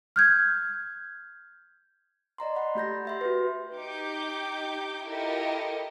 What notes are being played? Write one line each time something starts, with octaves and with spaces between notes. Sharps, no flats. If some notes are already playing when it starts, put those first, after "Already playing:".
F6 G6 G#6
D5 D#5 A#5 C6
F#5 B5
A3 G4 G6 A#6
G4 E5 C6
F#4 B4
D#4 G4 D6 G6
E4 F4 G4 A4 A#4 D#5